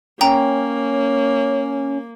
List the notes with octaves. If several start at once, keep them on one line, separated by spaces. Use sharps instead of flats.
A#3 C#4 C#5 G5 A#5